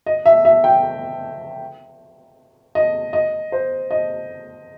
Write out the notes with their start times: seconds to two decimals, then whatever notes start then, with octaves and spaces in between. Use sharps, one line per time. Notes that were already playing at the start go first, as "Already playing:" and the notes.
0.06 D#5
0.26 E5
0.45 E5
0.64 G5
2.75 D#5
3.13 D#5
3.52 C5
3.91 D#5